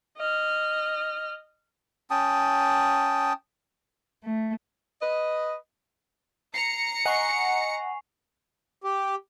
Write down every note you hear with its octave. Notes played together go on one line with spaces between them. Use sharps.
D#5 F6
C#4 G5 A5 D#6
A3
B4 D#5
A#5 C7 C#7 F7
D#5 F#5 G#5 C#6 C7
G4